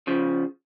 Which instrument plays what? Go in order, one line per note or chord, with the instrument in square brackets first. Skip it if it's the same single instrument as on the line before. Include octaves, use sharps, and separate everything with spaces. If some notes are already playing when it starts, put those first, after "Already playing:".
[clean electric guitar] C#3 F3